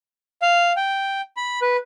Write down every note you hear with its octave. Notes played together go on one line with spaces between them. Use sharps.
F5
G5
B5
B4